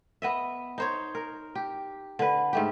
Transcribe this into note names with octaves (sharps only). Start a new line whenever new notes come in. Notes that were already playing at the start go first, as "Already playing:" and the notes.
B3 D#5 E5
D#4 C5 C#5
A#4
G4
D3 B4
G#2 A3 G4